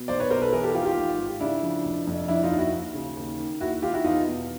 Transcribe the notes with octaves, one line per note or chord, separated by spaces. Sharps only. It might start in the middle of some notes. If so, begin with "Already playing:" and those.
Already playing: B2
B1 C5 D5
B4 C#5
B2 A#4 C5
A4 B4
E3 G#4 A#4
G4 A4
G#1 F4 G4
F4 G4
G#1
G#2
C#3 D4 E4
F3
F1
F2
F3 D4 E4
D#4 F4
D#2
E4 F#4
D#2
C#3
D#2
D#3
D#2 E4 F#4
D#3 F4 G4
E4 F#4
E2 D#4 F4
B2